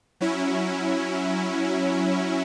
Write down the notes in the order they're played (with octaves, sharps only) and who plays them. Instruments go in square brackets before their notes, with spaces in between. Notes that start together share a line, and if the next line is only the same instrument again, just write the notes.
[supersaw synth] F#3 C#4 E4